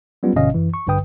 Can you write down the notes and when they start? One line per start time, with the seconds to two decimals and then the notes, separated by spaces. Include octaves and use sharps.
0.23 F#3 G3 B3 C#4 F4
0.36 G1 B2 C#4 D#5 F5
0.54 F#2 E3
0.74 C#6
0.87 A#1 G2 D3 B4 G5 D#6